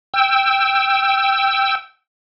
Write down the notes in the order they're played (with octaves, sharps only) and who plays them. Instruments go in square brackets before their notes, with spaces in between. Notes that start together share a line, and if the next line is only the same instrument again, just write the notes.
[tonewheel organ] G5 E6